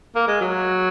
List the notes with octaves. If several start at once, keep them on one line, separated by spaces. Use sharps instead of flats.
A#3
G#3
F#3